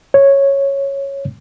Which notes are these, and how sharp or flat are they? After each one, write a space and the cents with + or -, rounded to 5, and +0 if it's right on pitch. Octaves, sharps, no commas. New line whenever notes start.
C#5 -5